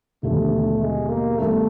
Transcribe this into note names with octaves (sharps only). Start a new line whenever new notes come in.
E1 D#2 D3 F3 A3
G#3
A#3
G2 D#3 G3 A3 B3